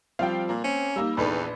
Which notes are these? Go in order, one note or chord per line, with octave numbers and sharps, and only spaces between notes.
F3 G3 C4 F5 G5
A#2 A#3
C4 C#4
G3 A#3 D#4 E6
A#1 E2 D#4 A4 B4 D5 B5